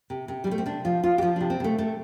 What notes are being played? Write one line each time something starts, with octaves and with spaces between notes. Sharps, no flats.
C3
C3
G3
C3 A3
C4
C3 D4
F3 F4
F3 F4
G4
F3 F4
C3 D4
C4
C3 A3
C3 A3